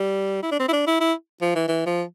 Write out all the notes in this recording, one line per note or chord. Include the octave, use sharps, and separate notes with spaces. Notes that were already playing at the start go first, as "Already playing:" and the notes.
Already playing: G3
E4
D4
C4
E4
D4
E4
E4
F3
E3
E3
F3